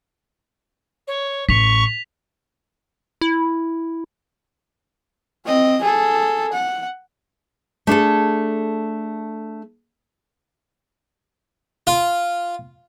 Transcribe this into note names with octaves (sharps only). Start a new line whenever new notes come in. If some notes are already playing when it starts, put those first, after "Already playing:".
C#5
A1 C#6 B6 F7
E4
C4 D#5
G#4 A4
F#5
A3 D4 G#4 A4
F4